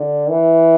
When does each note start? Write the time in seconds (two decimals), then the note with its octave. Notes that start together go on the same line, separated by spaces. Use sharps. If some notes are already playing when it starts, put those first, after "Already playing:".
Already playing: D3
0.29 E3